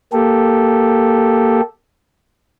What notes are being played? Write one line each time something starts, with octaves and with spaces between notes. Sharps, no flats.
A#3 G4 A4